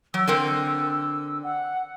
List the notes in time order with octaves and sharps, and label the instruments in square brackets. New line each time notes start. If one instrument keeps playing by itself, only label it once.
[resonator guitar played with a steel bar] F#3 [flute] E6
[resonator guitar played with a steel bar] D3 C4 A#4
[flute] F#5